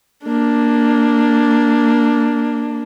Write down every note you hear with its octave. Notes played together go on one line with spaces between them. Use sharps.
A#3 D4